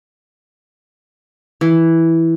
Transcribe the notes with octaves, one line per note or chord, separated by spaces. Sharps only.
E3